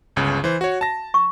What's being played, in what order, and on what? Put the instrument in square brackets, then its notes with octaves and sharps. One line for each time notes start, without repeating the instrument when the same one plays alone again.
[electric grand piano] G1 C#2 C#3
E3 C5
F#4 C#5
A5 A#6
[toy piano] C#6